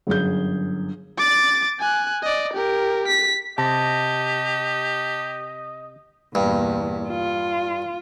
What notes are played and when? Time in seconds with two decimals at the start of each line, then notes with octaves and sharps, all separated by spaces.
0.07 G1 F#2 G#4 G6
1.18 D6 A6
1.79 G#5 F#6
2.23 D5 D#5
2.53 G4 A#4
3.07 B6
3.58 C3 G4 D#5 A5 A#6
6.35 E2 G2 A#2
7.08 F4